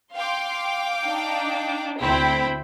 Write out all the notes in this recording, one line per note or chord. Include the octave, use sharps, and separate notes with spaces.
F5 G5 C6 D6
D4 D#4
D2 C4 E4 G5 B5